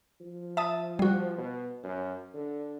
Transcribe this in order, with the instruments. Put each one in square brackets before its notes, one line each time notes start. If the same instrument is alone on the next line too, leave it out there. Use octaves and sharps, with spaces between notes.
[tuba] F3
[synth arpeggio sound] E5 A5 D#6
G3 F#4
[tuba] B2
F#2
D3